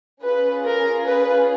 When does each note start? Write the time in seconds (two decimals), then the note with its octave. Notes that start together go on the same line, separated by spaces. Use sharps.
0.23 C#4 F4 G#4 B4
0.65 A#4
1.05 B4